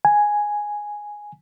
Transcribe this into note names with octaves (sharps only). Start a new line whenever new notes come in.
G#5